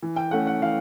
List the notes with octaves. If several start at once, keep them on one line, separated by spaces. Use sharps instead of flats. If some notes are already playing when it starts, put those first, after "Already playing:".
E3
G5
A3 C#4 F#5
F#5
E3 F5